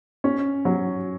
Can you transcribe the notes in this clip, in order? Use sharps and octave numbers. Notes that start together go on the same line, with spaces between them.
C#4
F#3